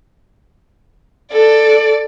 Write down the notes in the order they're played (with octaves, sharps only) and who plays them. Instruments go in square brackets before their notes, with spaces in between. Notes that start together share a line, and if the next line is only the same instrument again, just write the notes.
[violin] A4 D5